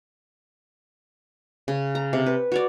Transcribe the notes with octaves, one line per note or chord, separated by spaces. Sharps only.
C#3
A#5
C3
B4
F#4 C#5 D5